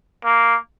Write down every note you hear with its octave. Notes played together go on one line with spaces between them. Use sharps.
A#3